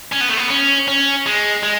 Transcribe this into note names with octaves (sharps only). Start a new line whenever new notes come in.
C#4
B3
A3
B3
C#4
C#4
G#3
G#3